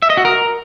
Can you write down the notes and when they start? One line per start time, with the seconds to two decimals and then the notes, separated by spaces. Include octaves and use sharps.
0.02 E5
0.10 D#5
0.17 F#4
0.25 A#4